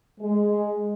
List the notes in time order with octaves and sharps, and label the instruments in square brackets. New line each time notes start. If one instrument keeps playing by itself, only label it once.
[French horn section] G#3